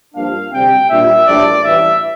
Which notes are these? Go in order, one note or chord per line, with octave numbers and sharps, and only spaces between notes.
G2 F3 A#3 D4 F5
D2 C3 G3 C4 G5
A#2 G3 D4 F4 E5
A#1 A2 G3 D4 D5
A1 G2 E3 E5